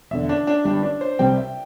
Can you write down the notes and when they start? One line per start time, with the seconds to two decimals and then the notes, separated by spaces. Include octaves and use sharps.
0.11 E1 E2 D3 E5
0.29 D4
0.47 D4
0.65 G1 G2 G3 D4
0.83 D4
1.01 C5
1.19 C2 C3 G3 C4 G5
1.37 E5